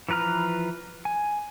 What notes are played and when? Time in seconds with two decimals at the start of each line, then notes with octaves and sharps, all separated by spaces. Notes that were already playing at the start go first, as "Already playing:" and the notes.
0.09 E3 F3 B4 A#5 F6
1.05 G#5